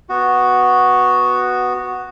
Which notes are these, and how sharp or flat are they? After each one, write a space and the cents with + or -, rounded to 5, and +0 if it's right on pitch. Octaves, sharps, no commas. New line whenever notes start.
B3 +0 F#4 +0